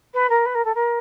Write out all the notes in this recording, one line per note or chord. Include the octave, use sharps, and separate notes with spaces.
B4
A#4
B4
A#4
A4
A#4